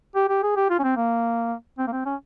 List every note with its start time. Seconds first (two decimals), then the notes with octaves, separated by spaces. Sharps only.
0.15 G4
0.29 G4
0.43 G#4
0.56 G4
0.70 F4
0.79 C#4
0.83 C4
0.97 A#3
1.78 C4
1.87 A#3
1.92 C4
2.06 C#4